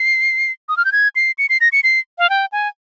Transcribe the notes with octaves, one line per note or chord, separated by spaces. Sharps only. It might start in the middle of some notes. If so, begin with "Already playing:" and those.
Already playing: C7
D#6
F6
G6
G#6
C7
C#7
C7
A#6
C#7
C7
F5
G5
G#5